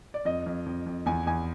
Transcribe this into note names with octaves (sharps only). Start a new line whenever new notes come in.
D5
F2 D#5
F2
F2
F2
E2 G#5
E2 G#5